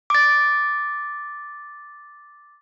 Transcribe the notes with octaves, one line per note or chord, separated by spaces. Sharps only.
D6 A6